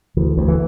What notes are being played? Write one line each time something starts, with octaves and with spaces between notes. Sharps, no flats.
D2 E3
D2
E3